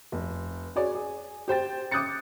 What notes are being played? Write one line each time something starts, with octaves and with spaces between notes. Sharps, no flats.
F1
F#4 G#4 C#5 D5
G#4
G4 C5 G5 A6
D6 D#6 F#6 G6 A6 C#7